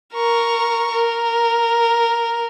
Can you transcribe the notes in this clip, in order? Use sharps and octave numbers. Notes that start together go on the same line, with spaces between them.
A#4 C#6
A#4